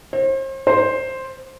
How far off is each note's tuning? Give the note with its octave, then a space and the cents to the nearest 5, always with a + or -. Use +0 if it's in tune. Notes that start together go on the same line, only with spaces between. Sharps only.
C5 +40
C5 +5